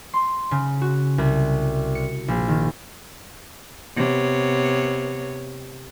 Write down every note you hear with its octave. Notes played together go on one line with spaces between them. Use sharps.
C6
C#3
F#4
C2
C#7
A#1
D#3
C3 B3 C#5